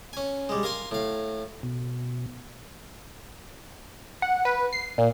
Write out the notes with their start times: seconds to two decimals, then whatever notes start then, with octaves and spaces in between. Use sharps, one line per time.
0.13 C#4 G#5
0.49 G3 G#3
0.63 A#4 F5 G#5 C6
0.91 A2 F5
1.63 B2
4.22 F#5
4.45 B4
4.73 C7
4.98 A#2